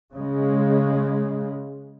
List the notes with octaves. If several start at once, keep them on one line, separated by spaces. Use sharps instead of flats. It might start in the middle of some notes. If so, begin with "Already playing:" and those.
C#3 G#3